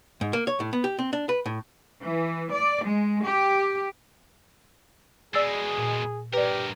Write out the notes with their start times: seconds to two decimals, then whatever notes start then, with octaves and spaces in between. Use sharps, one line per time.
0.21 G#2
0.33 A#3
0.47 C#5
0.60 A2
0.73 B3
0.84 G4
0.99 C4
1.13 D4
1.29 B4
1.46 A2
2.02 E3
2.53 D5
2.85 G#3
3.25 G4
5.34 B2 G#3 G#4 D5 E6 A6
5.78 A#2
6.33 G2 G4 A#4 B4 D5